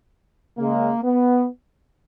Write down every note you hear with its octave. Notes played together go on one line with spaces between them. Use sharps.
C#3 G#3 A#3
B3